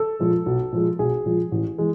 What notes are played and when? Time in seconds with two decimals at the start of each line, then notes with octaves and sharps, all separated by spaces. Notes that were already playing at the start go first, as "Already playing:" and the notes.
Already playing: A4
0.20 A#2 F3 G#3
0.46 B1
0.72 A#2 F3 G#3
0.99 B1 G#4
1.26 A#2 F3 G#3
1.52 A1
1.78 E3 G#3